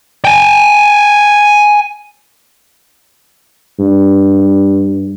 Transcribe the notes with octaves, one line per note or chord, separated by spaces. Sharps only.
G5 G#5
G2